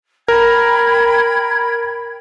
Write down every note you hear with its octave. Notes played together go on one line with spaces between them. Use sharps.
A#4 G5 B5 G#6